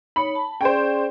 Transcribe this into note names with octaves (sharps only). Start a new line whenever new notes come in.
D#4 C#5 B5
A5
C#4 G#4 C5 D5 G5